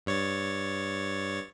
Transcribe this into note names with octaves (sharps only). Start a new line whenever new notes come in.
G2 C#5 A6